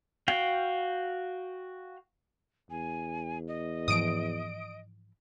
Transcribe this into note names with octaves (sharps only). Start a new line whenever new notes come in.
F#4 F5 G5
E2 G#5
D#5
G#2 E3 F3 D#6 D7